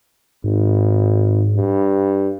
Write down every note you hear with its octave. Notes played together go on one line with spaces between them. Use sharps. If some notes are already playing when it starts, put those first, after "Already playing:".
G#1 G#2
G2